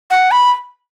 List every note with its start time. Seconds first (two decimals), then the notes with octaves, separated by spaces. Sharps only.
0.11 F#5
0.31 B5